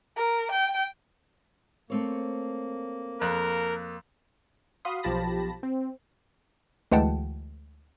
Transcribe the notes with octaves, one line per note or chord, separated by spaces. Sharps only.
A#4
G5
A3 A#3 C4 C#5
F2 A#4 F#6
F#4 F5 B5 C6 D#6
B1 F3 G4 A5 B5 A#6
C4
D2 E3 G#3 F#5 G5 A5